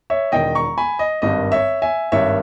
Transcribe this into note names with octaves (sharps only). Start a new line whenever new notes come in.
C#5 E5
E1 E2 D#3 D#5 G5
A#5 C#6
G#5 B5
D#5
G#1 G2 D#3 D#5
C#5 E5
E5 G#5
G#1 G2 D#3 C#5 E5